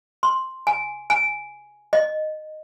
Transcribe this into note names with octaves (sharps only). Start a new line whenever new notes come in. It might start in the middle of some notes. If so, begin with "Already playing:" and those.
C6
G#5
G#5
D#5